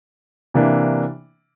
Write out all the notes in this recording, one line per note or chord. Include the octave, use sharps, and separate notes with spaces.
C3 E3 A#3 D4